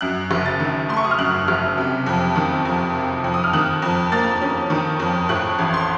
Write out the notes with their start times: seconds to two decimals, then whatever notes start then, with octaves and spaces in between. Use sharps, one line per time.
0.01 F#2 F#6
0.31 F#1
0.46 A6
0.60 D#3
0.89 A3 C6
0.97 C#6
1.04 D#6
1.11 F6
1.19 F#2 F#6
1.48 F#1 F6
1.78 C3
2.06 F2
2.36 D#3
2.65 F2
2.95 C3
3.24 F2
3.34 D#6
3.44 F6
3.53 D#3 F#6
3.82 F2
4.12 A#3 A6
4.41 C#4
4.70 D#3
5.00 F2
5.29 A2 F#6
5.58 A1
5.74 C6